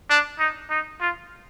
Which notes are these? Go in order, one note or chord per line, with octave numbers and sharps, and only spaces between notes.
D4
D#4
D#4
F4